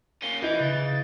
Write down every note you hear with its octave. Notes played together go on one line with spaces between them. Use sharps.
A#3 C#4 G7
E3 E4 D#5 G6
C#3 A6